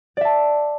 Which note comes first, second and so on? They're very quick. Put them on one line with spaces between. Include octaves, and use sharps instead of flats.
D5 E5 A5